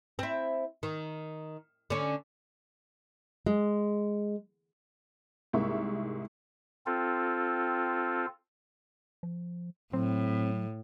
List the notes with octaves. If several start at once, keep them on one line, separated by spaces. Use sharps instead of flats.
C4 E4
D#3
D3 C#4
G#3
C2 G#2 A#3 E5 C#6
C4 F4 A4
F3
A2 F#3 C4